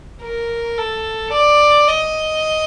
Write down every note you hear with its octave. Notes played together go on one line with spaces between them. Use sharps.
A#4
A4
D5
D#5